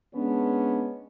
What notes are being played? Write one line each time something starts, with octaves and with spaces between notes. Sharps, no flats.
G#3 B3 C#4 D4